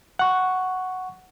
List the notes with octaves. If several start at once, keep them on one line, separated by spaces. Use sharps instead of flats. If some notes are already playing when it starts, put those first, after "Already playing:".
F#5 C#6